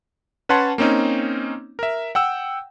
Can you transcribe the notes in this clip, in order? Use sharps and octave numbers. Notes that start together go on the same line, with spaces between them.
C#4 B4 C#5 F#5 A5 C6
A#3 C4 C#4 D#4
A#4 E5
F#5 G5 E6